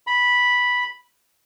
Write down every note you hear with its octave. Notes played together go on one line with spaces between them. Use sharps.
B5